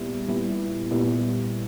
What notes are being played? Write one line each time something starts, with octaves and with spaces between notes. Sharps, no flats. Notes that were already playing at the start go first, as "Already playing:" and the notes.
Already playing: A#2 G3 B3 E4
A#2 G3 B3 E4
A#2 G3 B3 E4